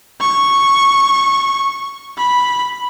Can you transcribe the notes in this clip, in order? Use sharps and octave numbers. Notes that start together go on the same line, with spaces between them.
C#6
B5